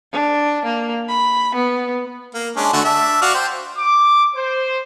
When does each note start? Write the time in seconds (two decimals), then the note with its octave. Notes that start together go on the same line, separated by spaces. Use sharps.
0.12 D4
0.66 A#3
1.08 B5
1.55 B3
2.34 A#3
2.56 G#3 C#4 D4
2.73 D3 A3 F#4
2.85 D4 E5
3.22 F#4 D5 F5
3.34 C5 G5
3.79 D6
4.36 C5